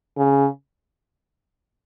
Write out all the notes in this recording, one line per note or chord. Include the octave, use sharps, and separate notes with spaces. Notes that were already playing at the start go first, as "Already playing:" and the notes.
C#3